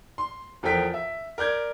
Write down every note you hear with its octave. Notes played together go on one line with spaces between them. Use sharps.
C6
E2 F3 A4 A#4 G5 B6
E5
A#4 D5 G6 G#6